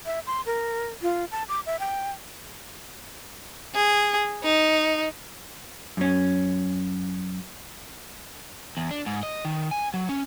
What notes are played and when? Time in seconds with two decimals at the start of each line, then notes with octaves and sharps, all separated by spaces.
0.06 E5
0.27 C6
0.46 A#4
1.02 F4
1.31 A5
1.49 D6
1.66 E5
1.80 G5
3.75 G#4
4.44 D#4
5.97 F#2 C#4
8.77 E2
8.91 D4
9.06 G#2
9.23 D#5
9.45 D#3
9.71 G#5
9.94 F#3
10.09 C#4